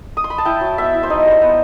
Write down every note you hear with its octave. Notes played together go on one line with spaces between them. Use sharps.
D#6
C6
B5
A5
E4 G5
F#3
B3 E5
E4
C5
D#4 D#5
G3
C5
B3